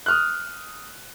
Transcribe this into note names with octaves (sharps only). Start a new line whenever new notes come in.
D#6 F6 F#6